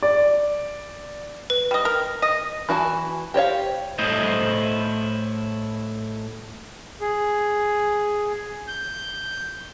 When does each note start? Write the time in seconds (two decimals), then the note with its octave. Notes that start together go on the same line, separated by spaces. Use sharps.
0.03 D5
1.50 B4
1.71 G3 D#5
1.85 A#4
2.22 D#5
2.69 E3 F#4 G#5 A5
3.34 G4 C5 C#5 F5
3.99 A2 A3 E4 C5 D#5
7.00 G#4
8.68 G6